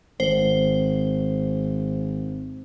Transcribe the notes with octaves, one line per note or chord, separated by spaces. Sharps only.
G#1 C5